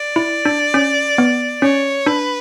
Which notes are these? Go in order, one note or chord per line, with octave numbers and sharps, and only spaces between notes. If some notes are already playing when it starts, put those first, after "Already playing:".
Already playing: D5
E4
D4
C#4
B3
C#4 C#5
D4 B4